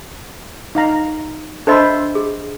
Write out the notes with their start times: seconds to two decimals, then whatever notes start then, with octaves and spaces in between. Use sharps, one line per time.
0.75 D#4 F5 A#5
1.67 D4 A4 C5 D#5 E5 B5
2.15 G#4